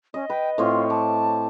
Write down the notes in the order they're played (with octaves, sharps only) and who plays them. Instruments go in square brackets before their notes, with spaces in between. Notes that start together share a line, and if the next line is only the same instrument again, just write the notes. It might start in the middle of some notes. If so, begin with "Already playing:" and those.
[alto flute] C#4 [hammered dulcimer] D#5
[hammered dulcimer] B4 [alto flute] G5
[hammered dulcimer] A2 C4 C#5 [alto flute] F4
[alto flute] A5 [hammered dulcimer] D6